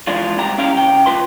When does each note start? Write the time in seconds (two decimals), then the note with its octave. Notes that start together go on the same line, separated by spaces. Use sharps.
0.07 E3 F3 G#3 D4 F4
0.38 C2 G#2 G4 A#5
0.58 C#4 E4 F5 G5 A#5
0.75 C#3 G5
1.06 D2 D#3 F4 B4 C6